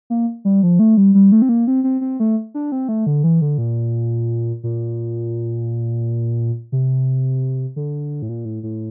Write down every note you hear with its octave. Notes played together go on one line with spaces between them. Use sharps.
A#3
G3
F3
A3
G3
G3
A3
C4
A#3
C4
C4
C4
A3
D4
C4
A3
D3
E3
D3
A#2
A#2
C3
D3
A2
A#2
A2
A2